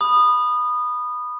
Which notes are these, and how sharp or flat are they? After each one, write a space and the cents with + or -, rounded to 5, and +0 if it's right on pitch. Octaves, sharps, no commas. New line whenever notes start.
B5 +0 D#6 -20